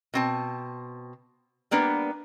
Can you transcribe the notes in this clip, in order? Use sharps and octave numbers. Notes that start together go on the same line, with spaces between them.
B2 C4 A5
G3 A#3 B3 D4 B4